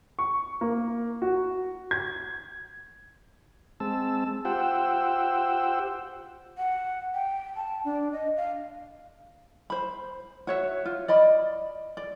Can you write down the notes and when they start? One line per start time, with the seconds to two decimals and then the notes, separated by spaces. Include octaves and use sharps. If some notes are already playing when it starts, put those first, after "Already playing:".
0.19 C#6
0.61 A#3
1.22 F#4
1.91 G#6
3.80 G#3 C4 A5 E6
4.45 F4 G4 C5 F#5 G5 E6
6.58 F#5
7.14 G5
7.56 A5
7.85 D4
8.13 D#5
8.37 F5
9.70 C5 B5
10.47 F#4 C#5 E5
10.85 F4
11.08 D5 D#5 B5
11.97 D5